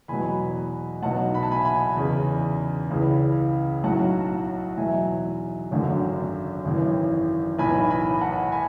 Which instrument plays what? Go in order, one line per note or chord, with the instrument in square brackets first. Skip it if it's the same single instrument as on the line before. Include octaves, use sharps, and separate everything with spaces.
[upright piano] E2 B2 F#3 G#5 B5
B1 B2 F#3 F#5 A5
B5
A5
G#5 B5
G#5 B5
E2 C#3 E3
C#2 C#3 E3
B1 A2 F#3 F#5 A5
E2 B2 F#3 E5 G#5
G#1 F#2 D3 F#3
G#1 F#2 E3
B1 A2 E3 G#5 B5
G#5 B5
F#5 A5
G#5 B5